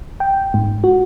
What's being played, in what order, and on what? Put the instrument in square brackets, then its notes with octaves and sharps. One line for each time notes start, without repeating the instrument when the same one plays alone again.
[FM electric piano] G5
G#2
F#4